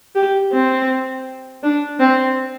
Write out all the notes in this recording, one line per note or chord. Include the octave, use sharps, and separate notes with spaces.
G4
C4
D4
C4